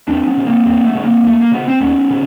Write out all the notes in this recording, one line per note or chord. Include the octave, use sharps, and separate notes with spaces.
E2 C4 D4
B3 C#4
C#3
A#3 C4
E2 A#3 C4
A3 B3
C#3
A#3 C4
D#2 A3
A#3
C#3 B3
C4
D#2 B3 C#4
C#3